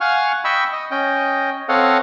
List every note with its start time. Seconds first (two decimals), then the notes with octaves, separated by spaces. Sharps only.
0.01 F5 F#5 G#5 C#6 F6
0.44 D#5 G5 B5 C#6 E6
0.73 D#5
0.91 C#4 D#5 G5
1.69 C4 A4 C#5 D#5 F5 F#5